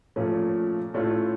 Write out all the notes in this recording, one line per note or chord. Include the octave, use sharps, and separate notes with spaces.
A#2 F3 A3 C#4
A2 A3 C#4 F4